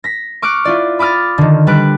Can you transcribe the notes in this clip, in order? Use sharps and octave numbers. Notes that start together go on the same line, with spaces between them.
A#6 B6
C#6 D6 F6 F#6 D7
E4 F4 D5
B5 D6 D#6 F6 A6
D3 D#3
G3 B4 F#6 D7